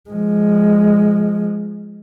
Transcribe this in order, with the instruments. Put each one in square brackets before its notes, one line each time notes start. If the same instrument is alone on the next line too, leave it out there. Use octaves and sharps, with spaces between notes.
[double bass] F3 G#3